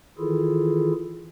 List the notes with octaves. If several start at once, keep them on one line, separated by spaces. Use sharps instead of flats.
D#3 E3 E4 F4 G#4 A4